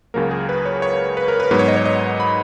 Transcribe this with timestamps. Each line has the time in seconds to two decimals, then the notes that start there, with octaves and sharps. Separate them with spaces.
0.14 C#2 C#3 F#3 A#3 A#4
0.31 G#4
0.49 B4
0.65 C#5
0.82 C#5
1.17 B4
1.28 A#4
1.40 B4
1.51 G#2 F#3 B3 B4
1.59 C#5
1.68 D#5
1.76 C#5
1.85 D#5
2.20 B5